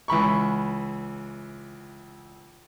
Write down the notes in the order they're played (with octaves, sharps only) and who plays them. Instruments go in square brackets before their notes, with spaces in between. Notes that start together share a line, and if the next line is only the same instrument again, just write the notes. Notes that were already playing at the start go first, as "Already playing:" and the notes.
[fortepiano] C#2 E3 B5 C#6